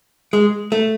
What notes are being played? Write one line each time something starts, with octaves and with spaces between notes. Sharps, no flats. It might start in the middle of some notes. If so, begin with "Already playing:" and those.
G#3
A3